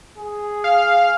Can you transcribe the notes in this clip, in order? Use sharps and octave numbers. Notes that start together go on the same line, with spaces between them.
G#4
F5